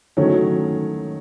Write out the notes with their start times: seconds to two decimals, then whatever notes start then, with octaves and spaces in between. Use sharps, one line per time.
0.17 D#3 F#3 A3 C#4